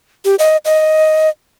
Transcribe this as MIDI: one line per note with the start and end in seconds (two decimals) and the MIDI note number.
0.25 0.35 67
0.39 0.57 75
0.65 1.29 75